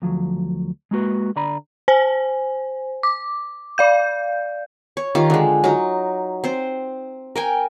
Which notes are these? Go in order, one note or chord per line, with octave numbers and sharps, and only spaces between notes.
D2 F3 F#3
G#3 A#3 F#4 B4
D3 D5 A#5 B5
C5 G#5
D6
D5 F5 G6
C#5
D#3 F4 G4
D3 G#3
F#3 D#4
C4 C5
A#4 G5 G#5